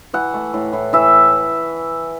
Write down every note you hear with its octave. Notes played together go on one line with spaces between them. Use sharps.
E3 F#5
A3
A2
A2
E3 E5